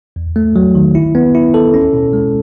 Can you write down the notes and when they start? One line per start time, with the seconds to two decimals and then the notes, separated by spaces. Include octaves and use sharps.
0.16 E2
0.36 A3
0.56 F#3
0.75 D#3
0.95 E4
1.15 B3
1.35 E4
1.54 A4
1.74 C#4
1.93 B2
2.13 G#3